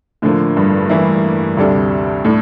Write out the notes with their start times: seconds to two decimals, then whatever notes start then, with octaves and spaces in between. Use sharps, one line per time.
0.22 A2 D3 F3 A#3
0.57 G2
0.89 E3 A#3 E4
1.57 D2 C3 G3 D4 A4
2.25 A2 D4 A4